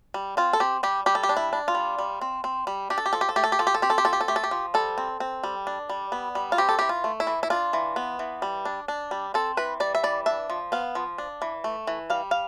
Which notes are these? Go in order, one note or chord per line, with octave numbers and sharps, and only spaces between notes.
G3
C4 F4
A4
C4 G4
G3 G4
G3 G4
A4
G4
D4
E4
D4
F4
G3
G3
C4
C4
G3
D4 G4
A4
G4
F3 A4
G4
A4
A3 G4
A4
G4
F3 A4
G4
A4
C4 G4
A4
G4
F3 A4
G4
A4
A3 G4
A4
G4
F3
G3 A4
C4
C4
G3
D4
G3
B3
G3
F4
C4 G4
A4
E3 G4
F4
A3
E4
E3
E4
D4 F4
E3
B3
E3
G3
D4
D4
G3
C4 A4
E3 B4
G3 D5
E5
E3 D5
D4 E5
F3
B3 F5
F3
D4
E3
A3
E3
G3 F5
F5